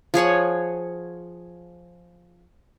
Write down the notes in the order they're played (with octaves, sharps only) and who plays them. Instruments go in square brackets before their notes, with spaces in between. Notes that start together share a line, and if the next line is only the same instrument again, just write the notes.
[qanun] F3 G#4 C#5 F#5